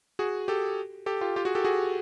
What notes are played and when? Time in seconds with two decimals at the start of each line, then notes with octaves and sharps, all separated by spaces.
0.19 F#4 G#4
0.48 G4 A4
1.06 G4 A4
1.21 F4 G4
1.36 F4 G4
1.45 F#4 G#4
1.55 G4 A4
1.65 F#4 G#4